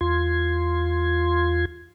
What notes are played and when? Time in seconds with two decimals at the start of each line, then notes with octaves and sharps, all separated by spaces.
0.01 E2 F4 C6 G#6